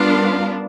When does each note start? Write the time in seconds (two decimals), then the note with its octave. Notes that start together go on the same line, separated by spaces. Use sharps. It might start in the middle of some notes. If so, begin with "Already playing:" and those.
Already playing: G3 B3 D4 F4 A#4 F5